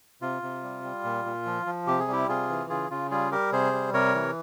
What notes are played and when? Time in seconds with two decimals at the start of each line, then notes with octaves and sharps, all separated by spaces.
0.22 C3 F4
0.42 C3
0.63 G3
0.84 G3
1.04 A#2
1.25 A#2
1.46 F3
1.66 F3
1.87 C3 G4
2.00 G#4
2.08 G3 E4 G4
2.28 C3 F4 G#4
2.49 E3
2.70 C#3 F4 G#4
2.90 C#3 F4
3.11 G3 F4 G#4
3.32 G3 G4 A#4
3.52 C3 G#4 C5
3.73 G3
3.94 C3 A#4 C#5
4.15 E3